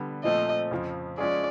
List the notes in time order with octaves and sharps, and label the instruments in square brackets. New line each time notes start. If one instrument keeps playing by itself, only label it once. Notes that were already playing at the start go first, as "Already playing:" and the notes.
Already playing: [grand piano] D3 G3 B3
[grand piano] A#2 F3 A3 C4 [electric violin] D#5
[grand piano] F2 C#3 F3
[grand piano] F3 G#3 C#4 F4 G#4 [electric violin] D5